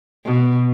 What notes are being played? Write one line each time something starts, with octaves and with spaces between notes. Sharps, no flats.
B2